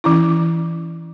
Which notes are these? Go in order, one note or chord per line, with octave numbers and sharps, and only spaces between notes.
E3 C#4 E4